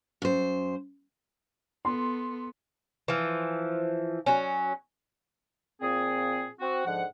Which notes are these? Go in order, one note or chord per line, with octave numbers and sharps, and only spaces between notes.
F#2 C5
B3 A4 C6
E3 F3
F#3 C#4
A#2 F3 C4 G#4
C4 F#4
G#2 D3 F3 F#5